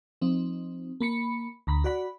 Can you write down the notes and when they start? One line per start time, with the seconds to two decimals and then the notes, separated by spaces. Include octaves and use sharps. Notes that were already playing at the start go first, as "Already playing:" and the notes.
0.22 F3 C4 D#4
1.00 A#3 B5 C#7
1.67 D2 A#5 B5
1.84 F#4 D5 F#5 B5